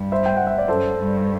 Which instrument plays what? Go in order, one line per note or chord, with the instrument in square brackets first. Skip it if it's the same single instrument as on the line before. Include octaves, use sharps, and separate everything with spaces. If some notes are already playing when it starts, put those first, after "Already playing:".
Already playing: [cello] G2
[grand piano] C5 E5
G5
F#5
E5
D5
[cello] F#2 [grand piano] A4 C5
[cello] G2